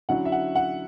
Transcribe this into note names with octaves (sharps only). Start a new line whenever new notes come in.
D3 F#3 C#4 E4 F#5
E5
F#5
F#5